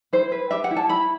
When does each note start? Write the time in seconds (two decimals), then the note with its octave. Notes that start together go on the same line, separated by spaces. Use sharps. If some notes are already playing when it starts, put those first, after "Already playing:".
0.13 E4 C5
0.32 B4
0.51 G4 E5
0.64 F#5
0.71 E4
0.76 A5
0.89 E4 B5